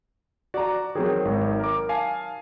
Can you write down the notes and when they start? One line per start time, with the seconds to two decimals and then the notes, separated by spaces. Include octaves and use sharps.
0.54 F#4 D5 A#5
0.95 D#3 F#3 C4 G#4
1.25 G#1
1.59 A#4 D6
1.89 F5 G#5 A5